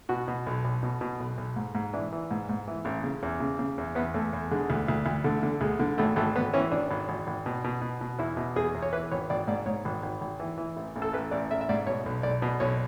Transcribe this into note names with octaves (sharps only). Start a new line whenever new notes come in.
B2 F#4
B2
B1
B1
B2
B2
B1
B1
G#2
G#2
E3 D4
E3
G#2
G#2
E3
A1
C#3
E2
C#3
C#3
E2
E2 B3
E2 A3
E2
D3 G#3
D2
D2
D2
D3 A3
D3
D2 G#3
D3
G#1 A3
G#1 A3
G#1 B3
E3 C#4
G#1 D4
G#1
G#1
G#1
B2
B2
B2
B2
E2 E4
B2
E2 G#4
E2
C#5
E3 B4
G#1 C#5
G#1 D5
G#2 D5
G#2 C#5
G#1
G#1
G#1
E3
E3
A1
A1
A4
A1 B4
A1 D5
A1 E5
E5
G#2 D5
B2 C#5
B1
B1 D5
B2
B1 C#5